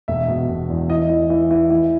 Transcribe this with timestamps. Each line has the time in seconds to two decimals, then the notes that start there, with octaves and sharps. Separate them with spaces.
0.08 E1 E5
0.28 B2
0.48 E1
0.69 E2
0.90 E3 D#5
1.09 E3
1.30 E3
1.51 E3
1.70 E3